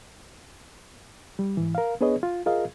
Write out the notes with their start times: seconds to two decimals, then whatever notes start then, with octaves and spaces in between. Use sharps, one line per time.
1.39 G3
1.57 G#2 E3
1.75 A#4 F5
2.01 B3 D4 G#4 B4 C#5 D#5
2.23 F4
2.46 F4 G#4 A#4 D#5 F5